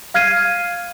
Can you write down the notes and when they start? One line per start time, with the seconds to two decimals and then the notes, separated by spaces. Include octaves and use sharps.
0.14 F5 F6 G#6 C7 D#7